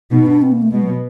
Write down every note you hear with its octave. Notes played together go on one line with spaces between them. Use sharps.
B2 D#4
D4
C4
A#3
A3
B2 G#3
F#3